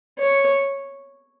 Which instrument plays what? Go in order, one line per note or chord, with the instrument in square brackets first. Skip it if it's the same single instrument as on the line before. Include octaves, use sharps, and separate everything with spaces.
[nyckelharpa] C#5